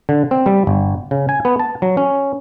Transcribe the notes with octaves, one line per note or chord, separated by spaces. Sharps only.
D3
C4
G3
G1
C#3
G#5
B3
A5
F#3
C#4